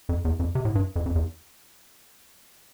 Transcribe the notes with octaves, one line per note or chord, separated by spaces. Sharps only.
F2
E2
F2
C3
A2
G2
F2
F2
E2